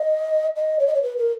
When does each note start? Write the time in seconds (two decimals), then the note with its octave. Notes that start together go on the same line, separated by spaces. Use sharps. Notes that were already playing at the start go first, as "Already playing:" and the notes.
Already playing: D#5
0.56 D#5
0.79 C#5
0.87 D#5
0.94 C#5
1.03 B4
1.17 A#4